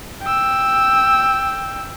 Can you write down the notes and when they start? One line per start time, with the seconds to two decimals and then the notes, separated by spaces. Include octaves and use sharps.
0.23 G5 E6